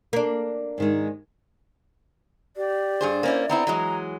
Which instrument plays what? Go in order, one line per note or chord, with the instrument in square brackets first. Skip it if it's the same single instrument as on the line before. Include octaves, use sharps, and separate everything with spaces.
[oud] A#3 D4
[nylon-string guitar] G#2 D#3 G#3
[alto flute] G4 [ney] D5
[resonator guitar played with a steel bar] G2 G#4 C5
[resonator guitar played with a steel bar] A#3 C#4 E4 [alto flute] C5
[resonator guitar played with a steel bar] B3 C4 E4 [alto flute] A#5
[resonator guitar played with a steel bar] E3 F#3 G#3